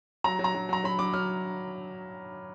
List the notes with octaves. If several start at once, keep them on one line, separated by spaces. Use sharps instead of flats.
F#3 A#5
F#3
A#5
F#3
F#3 A#5
F#3 B5
F#3 D6
F#3 F6